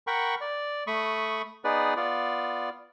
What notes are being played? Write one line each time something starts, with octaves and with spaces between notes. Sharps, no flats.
A#4 F#5 G5 B5 C#6
D5
A3 B5 C#6 D#6
B3 D#4 G#4 B4 D5
B3 F4 D5